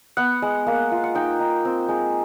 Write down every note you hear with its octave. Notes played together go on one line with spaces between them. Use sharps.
B3 F#5
G#3
A#3
F4
F#5
D#4 G5
D#4
C4
G#3